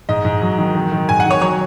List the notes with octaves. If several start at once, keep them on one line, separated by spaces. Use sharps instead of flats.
G#2 D#5
G#2
F#3
D#3
D#3
D#3
G#2 G#5
F#5
D#3
C#5
F#3 C#5